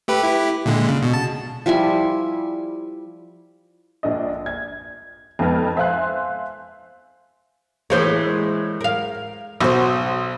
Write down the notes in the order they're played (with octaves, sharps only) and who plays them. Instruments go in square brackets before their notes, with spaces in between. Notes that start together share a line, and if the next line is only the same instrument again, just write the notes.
[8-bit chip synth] A3 G4 B4
E4 G4
A#2 D3 G#3
C#3
B2
A5
[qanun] F3 G3 E4 G#5
[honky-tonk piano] A#1 D4 D#5
G#6
F2 G#2 B3 F6
C5 E5 F5 G#5 C6 F#6
[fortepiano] A2 C5 C#5 [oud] E3 G#3 A#3
[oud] A#4 F5
[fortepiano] B1 [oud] F#4 C5